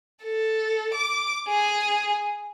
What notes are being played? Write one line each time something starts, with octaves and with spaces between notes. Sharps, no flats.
A4
D6
G#4